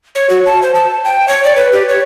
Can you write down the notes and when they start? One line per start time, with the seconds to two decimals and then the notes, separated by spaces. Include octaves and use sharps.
0.15 C#5
0.30 F#4
0.46 A5
0.62 C5
0.75 A5
1.05 G5
1.28 C#5
1.45 D5
1.56 B4
1.72 G4
1.89 C#5